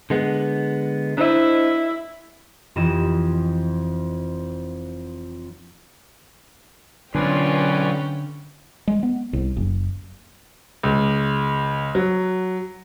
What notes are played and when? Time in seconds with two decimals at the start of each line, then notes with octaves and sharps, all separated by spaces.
0.10 D3 G#3 B3
1.18 D4 E4 C5 D#5
2.76 F1 F2 E3 D#5 E7
7.15 B1 D3 C#4 F4 B4 D5 G5 G#5
8.87 G#3
9.03 B3
9.33 C2
9.57 F#1
10.83 C#2
11.95 F#3